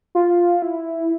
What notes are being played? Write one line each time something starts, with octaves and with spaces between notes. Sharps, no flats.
F4
E4